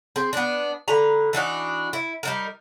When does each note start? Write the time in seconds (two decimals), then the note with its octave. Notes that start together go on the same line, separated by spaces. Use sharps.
0.16 C4 G#4
0.33 B3 D4
0.88 D3 B4 A#5
1.33 E3 D4 D#4 F#4
1.93 E4
2.23 G3 D#4 A#4